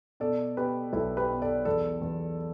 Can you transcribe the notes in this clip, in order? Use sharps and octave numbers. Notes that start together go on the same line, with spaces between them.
B2 A4 D5
B2 G4 B4
B1 E4 A4
G4 B4
B2
A4 D5
E2 A4 D5
E2